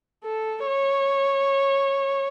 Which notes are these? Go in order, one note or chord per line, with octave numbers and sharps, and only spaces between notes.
A4
C#5